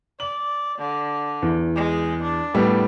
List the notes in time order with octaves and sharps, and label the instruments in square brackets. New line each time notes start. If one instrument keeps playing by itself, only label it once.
[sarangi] D5 [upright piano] F#7
[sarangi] D3
[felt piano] E2
[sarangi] G#3
D4
[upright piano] A2 G3 B3